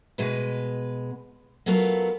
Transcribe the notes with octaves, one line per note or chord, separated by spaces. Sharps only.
B2 G#3 B4
F#3 A3 B3 F4 A#4